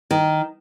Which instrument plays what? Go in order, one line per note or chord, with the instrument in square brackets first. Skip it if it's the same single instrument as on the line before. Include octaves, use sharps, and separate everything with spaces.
[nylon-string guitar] D#3